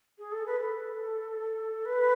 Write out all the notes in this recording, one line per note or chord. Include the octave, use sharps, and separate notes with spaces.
G#4
A4
B4
A4
B4